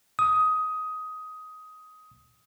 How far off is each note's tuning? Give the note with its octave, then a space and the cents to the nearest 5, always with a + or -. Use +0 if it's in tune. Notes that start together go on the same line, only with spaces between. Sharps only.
D#6 +15